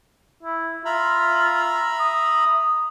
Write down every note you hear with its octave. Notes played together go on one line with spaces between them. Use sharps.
E4
F4 E5 A#5 B5
D#6